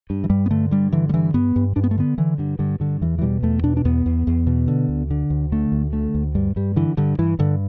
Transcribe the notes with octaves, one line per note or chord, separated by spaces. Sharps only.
G2
E3
G2 G3
B3
D3 A3
G2 G3
D3 E3
G3
G2 E3
G2 B3
G2
G2 D4
B3
A3
D3 B3
D3 E3
G2 D3
G2 D3
G2 D3
E2 E3
E3
B2 G3
E2 A3
B2 D4
D4
E2 B3
E2
E2
B2
D3
D2
D3
D2
D3 A3
D2
D3 A3
D2
G2 G3
G2 G3
D3 E3
G2 D3
G2 E3
G2 D3